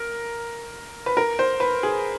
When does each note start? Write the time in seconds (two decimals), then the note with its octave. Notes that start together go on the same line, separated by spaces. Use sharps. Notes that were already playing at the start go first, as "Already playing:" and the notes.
Already playing: A#4
1.06 B4
1.17 A#4
1.39 C5
1.60 B4
1.83 G#4